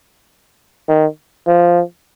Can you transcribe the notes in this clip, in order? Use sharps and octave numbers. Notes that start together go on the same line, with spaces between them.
D#3
F3